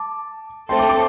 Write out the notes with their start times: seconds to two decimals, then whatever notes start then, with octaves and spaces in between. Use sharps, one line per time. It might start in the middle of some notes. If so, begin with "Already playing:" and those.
Already playing: A5 D6
0.69 A3 C4 A4 G5 C6
0.79 A5 D6
0.89 A5 D6